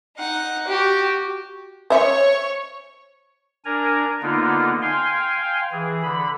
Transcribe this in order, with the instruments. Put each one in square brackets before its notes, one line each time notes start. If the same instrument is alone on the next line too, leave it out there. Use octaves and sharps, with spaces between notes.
[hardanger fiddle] D#4 F#5
F#4 G4
[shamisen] C5 E5 [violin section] C#5
[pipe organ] D4 A#4 G#5 A#5
D3 A#3 B3 D#4 F4
F5 G5 G#5 C6
E3 G#4
D3 B5